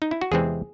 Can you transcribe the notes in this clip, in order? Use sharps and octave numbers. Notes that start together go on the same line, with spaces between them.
D#4
E4
F#4
E2 C3 E3 G#3 C4 G#4